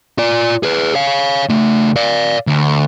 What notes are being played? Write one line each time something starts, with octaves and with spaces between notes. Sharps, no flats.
F4 D5
G#4 B4
C#5 F5
C#3 A3
D5 F5
D2